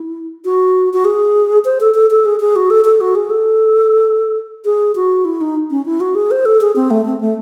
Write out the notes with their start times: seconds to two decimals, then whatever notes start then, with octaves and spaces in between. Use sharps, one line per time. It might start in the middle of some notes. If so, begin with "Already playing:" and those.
Already playing: E4
0.45 F#4
0.93 F#4
1.05 G#4
1.65 C5
1.80 A4
1.95 A4
2.11 A4
2.25 G#4
2.40 G#4
2.56 F#4
2.70 A4
2.85 A4
3.01 F#4
3.15 G#4
3.30 A4
4.65 G#4
4.96 F#4
5.25 E4
5.41 D#4
5.71 C#4
5.85 E4
6.00 F#4
6.15 G#4
6.31 C5
6.45 A4
6.61 G#4
6.76 C4
6.91 A3
7.06 C4
7.21 A3